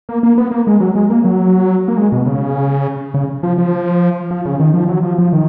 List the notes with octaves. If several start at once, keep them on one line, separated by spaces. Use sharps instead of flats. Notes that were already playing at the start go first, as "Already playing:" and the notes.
A#3
A#3
B3
A#3
G#3
F#3
G#3
A#3
F#3
A#3
G#3
B2
C#3
C#3
F3
F3
F3
C#3
D#3
F3
F#3
F3
F3
D#3